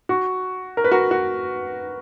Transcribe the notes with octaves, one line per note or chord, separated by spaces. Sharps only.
F#4
A#4
B4
F#4 A#4
F#4